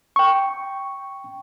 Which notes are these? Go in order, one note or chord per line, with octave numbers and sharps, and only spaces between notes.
G5 C#6